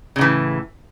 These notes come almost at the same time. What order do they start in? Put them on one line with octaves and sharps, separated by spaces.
C#3 A2 E3